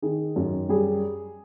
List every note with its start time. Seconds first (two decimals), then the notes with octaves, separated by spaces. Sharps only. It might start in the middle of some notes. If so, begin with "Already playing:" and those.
0.02 D#3 G#4
0.36 F#2
0.69 G3 G#4